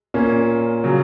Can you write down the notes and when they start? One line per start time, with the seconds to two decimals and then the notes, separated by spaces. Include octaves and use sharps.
0.14 A#2 A#3 C#4
0.84 C#3 F#3